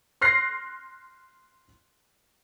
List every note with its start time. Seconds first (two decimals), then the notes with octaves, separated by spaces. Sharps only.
0.21 C6 F6 F#6 A#6 C7